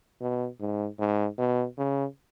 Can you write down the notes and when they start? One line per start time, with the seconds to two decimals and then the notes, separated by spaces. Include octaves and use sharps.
0.21 B2
0.60 G#2
0.99 G#2
1.38 B2
1.77 C#3